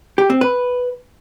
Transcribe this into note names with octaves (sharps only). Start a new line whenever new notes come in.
G4
C4
B4